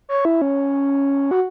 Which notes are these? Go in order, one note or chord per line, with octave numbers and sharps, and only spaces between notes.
C#5
E4
C#4
F#4